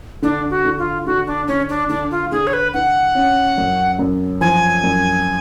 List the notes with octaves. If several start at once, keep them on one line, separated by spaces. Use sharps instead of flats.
D3 D4
F#4
D3
F4
D3 F#4
D4
D3 C#4
D4
D3 D4
F4
D3 G#4
C#5
B4
D3 F#5
C#4
F#2
F#2
F3 G#5
F#2